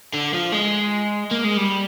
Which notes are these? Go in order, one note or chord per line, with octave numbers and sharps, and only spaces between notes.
D3
F3
G#3
A#3
G#3
G3